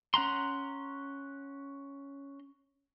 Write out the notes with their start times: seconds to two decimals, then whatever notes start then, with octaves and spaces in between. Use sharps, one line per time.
0.14 C#4 F#5 A#5 C6